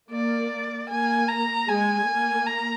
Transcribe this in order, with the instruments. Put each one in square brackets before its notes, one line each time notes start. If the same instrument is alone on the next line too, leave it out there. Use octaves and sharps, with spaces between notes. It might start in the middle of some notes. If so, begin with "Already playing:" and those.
[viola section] A#3 [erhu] D5
[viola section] A#3 [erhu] G#5
[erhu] A#5
[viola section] G#3 [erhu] G#5
[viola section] A#3
[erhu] A#5